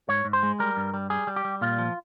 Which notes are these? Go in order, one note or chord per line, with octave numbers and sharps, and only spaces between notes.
G#2 C#5
G#2
C5
G#3
G3 A#4
G2
G3
G3 G#4
G3
G4
G3
A#2 F4
F3